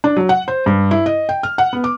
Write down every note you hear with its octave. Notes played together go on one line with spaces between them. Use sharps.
D4
F#3
F#5
C5
G2
E4
D#5
G5
F6
F#5
B3
D6